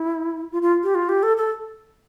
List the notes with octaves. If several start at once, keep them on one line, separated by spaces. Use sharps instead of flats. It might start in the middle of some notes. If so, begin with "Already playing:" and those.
Already playing: E4
F4
F4
G4
F4
G4
A4
A4